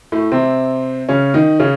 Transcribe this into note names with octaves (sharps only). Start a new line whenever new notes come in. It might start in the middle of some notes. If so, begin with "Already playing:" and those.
A2 A3
C3 C4
C#3 C#4
D#3 D#4
C#3 C#4